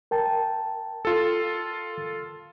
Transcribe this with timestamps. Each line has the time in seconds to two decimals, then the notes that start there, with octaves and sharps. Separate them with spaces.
0.11 A#4 G5 A5
1.05 F4 A4